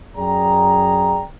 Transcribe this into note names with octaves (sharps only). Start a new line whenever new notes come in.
F#2 G#4 D5 G5 A#5